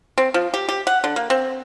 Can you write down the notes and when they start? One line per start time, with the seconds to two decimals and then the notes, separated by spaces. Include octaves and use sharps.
0.18 C4
0.34 F3
0.54 G4
0.69 G4
0.87 F#5
1.04 D3
1.16 A#3
1.30 C4